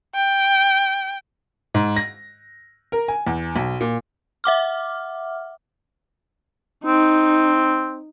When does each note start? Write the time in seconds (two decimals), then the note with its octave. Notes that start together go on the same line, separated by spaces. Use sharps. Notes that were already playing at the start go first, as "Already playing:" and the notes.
0.15 G5
1.74 G#2
1.96 A#6
2.92 A#4
3.08 G#5
3.27 E2
3.56 B1
3.81 A#2
4.44 E5 F#5 D6 F6
6.86 C4 D#4